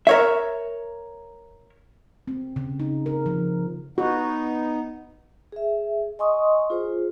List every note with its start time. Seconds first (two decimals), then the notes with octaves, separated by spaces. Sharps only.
0.07 A#4 C#5 E5
2.27 C4
2.56 C#3
2.80 D#4
3.06 A#4
3.26 F3
3.98 B3 D#4 F#4
5.52 G#4 E5
6.19 D#5 G#5 C6 C#6 D#6
6.70 F4 G#4 C5